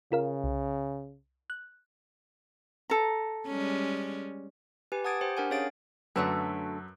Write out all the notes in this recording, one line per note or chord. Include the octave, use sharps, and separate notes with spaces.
C#3 F4 A#4 F5
C2
F#6
A4 A#5
G3 G#3 C#4
G4 B4 G#5
F#5 A5 D#6 G#6 A6 D7
G4 C5 G5
D4 A#4 F#5 G#5
C#4 G#4 C#5 F5 A6 D7
F#2 D3 F#3 A3 B4 E6